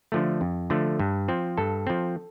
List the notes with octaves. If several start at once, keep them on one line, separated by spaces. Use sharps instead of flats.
D3 F3 A3
F2
D3 F3 A3
G2
F3 C4
G2 A4
F3 C4